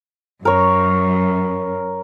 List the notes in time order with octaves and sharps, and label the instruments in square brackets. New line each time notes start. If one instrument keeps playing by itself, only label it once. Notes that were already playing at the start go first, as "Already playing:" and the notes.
[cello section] F#2 [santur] A#4 C#5